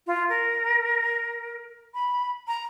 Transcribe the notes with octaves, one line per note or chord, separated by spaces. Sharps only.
F4
A#4
B5
A#5